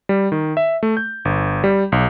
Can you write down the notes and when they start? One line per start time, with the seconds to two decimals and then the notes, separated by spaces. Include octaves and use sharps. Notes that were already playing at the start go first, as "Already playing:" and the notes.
0.09 G3
0.32 D#3
0.57 E5
0.83 A3
0.97 G6
1.25 G1
1.64 G3
1.92 B1